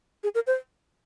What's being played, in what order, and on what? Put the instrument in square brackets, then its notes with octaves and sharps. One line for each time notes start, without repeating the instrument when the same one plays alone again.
[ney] G#4
A#4
C5